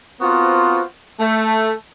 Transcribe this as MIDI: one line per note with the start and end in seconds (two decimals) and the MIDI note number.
0.20 0.80 59
0.20 0.80 60
0.20 0.80 65
0.20 0.80 66
0.20 0.80 70
0.20 0.80 72
1.19 1.71 57